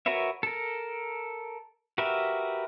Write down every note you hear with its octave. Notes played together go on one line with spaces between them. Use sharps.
F#4 A#4 B4 C#5 E5
A4 A#4
F#4 G4 A#4 B4 E5